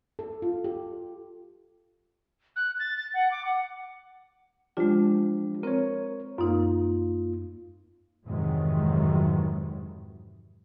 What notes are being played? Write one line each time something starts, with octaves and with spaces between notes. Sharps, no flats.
A4
F4
G4
F#6
A6
A6
F#5
D6
F#5
F3 G#3 D4 F4 G4
C4 A#4 C5 C#5
F#2 A#3 D#4 F4
F2 G#2 C3 D#3 E3 F#3